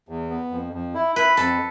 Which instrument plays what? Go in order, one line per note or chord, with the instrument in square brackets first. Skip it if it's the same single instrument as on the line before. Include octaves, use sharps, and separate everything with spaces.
[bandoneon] E2
B3
F2
F2
E4
[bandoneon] E4 [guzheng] B4
[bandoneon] F2 [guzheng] A4